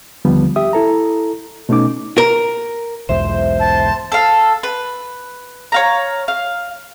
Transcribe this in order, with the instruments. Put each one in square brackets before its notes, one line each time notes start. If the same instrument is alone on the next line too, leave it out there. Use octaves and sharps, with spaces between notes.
[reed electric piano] D#2 D3 F3 G3 B3
G4 E5 D#6
E4 A4 A#5
B2 A3 C#4 D#4 D6
[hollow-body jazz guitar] A#4
[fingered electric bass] B1 E2 G#2 [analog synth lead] C5 [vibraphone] E5
[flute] A5
[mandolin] A4 F5
B4
C#5 F5 A#5
F5